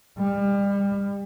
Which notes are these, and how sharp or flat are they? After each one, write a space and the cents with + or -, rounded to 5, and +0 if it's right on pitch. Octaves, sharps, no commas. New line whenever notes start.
G3 +30